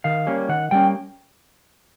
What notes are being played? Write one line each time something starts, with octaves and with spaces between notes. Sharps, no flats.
D#3 F5
G3 A#3 C#4
D#3 F#5
G3 A#3 C#4 G5